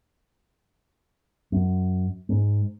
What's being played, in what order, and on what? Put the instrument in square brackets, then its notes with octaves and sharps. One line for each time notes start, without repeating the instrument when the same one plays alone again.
[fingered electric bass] F#2
G#2